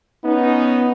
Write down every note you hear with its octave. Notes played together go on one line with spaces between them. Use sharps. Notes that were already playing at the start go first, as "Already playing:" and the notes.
B3 C#4 D#4